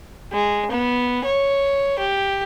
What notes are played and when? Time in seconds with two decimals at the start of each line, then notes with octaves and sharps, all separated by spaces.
0.33 G#3
0.71 B3
1.25 C#5
1.99 G4